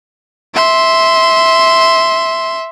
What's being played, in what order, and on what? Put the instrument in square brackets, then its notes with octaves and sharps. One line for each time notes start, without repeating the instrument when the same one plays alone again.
[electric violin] E5 C6